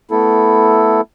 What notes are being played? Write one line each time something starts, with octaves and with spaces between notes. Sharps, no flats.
A3 B3 E4 A4